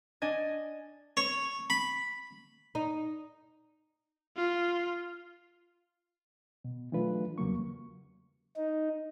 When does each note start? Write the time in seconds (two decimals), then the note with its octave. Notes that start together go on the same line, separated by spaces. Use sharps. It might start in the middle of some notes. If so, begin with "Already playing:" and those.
0.22 D4 D#5 G#5 G#6
1.17 C#5
1.70 B5
2.75 D#4
4.36 F4
6.65 B2
6.92 E3 F#3 A3 D4 F4 B4
7.38 E2 C#3 F#3 G3 A#3 C#6
8.56 D#4